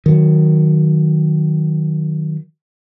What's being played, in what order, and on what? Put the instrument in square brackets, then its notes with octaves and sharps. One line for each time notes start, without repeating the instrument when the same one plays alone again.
[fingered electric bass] D#3 F#3